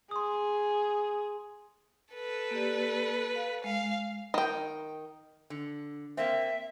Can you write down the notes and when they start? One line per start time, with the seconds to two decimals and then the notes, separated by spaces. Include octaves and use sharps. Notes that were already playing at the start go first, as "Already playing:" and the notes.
0.11 G#4 C6 D#6
2.14 A4 B4
2.51 A#3 G4 D5
3.35 F5
3.64 G#3 F5
4.34 D#3 G5
5.50 D3
6.17 A#3 C4 E5